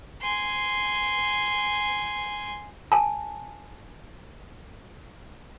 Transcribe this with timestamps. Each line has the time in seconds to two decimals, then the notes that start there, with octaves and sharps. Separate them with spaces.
0.22 G#5 C6
2.92 G#5 A5